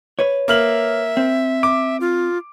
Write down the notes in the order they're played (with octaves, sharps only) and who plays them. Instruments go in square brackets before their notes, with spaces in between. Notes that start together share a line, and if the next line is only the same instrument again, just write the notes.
[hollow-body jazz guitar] B4 C#5
[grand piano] A#3 F6 F#7 [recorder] E5
[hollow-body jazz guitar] C4
[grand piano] D6
[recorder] F4